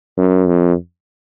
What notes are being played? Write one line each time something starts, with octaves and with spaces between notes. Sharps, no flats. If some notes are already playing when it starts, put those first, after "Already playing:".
F#2
F2